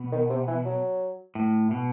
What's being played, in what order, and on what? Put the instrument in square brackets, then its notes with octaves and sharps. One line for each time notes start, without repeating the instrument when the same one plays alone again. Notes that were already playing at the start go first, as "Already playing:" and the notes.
Already playing: [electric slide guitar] B2
[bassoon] D#3
C3
E3
F#3
[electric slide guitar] A2
B2